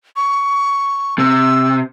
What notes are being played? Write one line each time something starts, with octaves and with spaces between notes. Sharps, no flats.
C#6
C3 E6